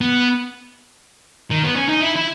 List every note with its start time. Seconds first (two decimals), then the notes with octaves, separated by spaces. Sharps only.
0.01 B3
1.50 D#3
1.64 B3
1.76 C#4
1.88 D#4
2.00 E4
2.16 E4